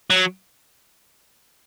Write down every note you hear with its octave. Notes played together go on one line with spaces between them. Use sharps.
F#3